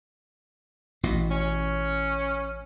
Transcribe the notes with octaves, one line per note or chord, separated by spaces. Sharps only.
A1 B2
C#4